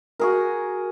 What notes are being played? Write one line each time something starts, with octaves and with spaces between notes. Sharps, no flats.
F#4 G#4 A#4